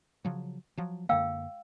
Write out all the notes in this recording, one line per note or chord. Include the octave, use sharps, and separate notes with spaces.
C#3 F3 F#3
F3 F#3
F#2 D3 A#3 F5 G5 E6